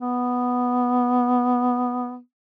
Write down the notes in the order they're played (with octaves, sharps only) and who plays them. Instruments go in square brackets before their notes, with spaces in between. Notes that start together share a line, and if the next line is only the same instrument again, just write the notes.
[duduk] B3